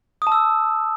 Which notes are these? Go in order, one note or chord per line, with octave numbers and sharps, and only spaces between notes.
D#6
A5
E6